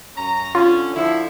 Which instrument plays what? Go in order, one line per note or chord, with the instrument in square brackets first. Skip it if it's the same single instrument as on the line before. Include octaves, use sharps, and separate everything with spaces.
[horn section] F#2 C#4 A#5
[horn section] D3 C#4 [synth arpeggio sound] F4
[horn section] D3 F3 E4